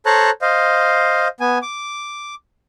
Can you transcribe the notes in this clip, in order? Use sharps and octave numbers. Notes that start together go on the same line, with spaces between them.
A4 C5 C#5 A5 A#5 F#6
C5 D#5 F5
B3 G#5
D6